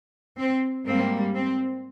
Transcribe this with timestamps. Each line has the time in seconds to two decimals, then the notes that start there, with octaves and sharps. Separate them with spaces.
0.39 C4
0.87 G#2 G3 A#3 C4
1.35 C4